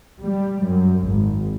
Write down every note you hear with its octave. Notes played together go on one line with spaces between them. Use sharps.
G3
F#2
G#1